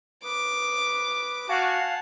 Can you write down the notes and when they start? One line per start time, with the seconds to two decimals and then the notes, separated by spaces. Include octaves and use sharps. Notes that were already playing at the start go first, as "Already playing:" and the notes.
0.24 B4 D6 D#6
1.49 F#4 F5 F#5 G#5 A5